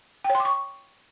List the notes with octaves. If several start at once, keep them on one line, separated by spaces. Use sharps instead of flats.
G5
C#5
C6
D6
C#6